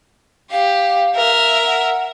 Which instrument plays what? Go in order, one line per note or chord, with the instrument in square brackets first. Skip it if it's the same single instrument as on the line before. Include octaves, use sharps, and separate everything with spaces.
[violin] G4 [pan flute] F5
[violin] A#4 E5
[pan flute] F#5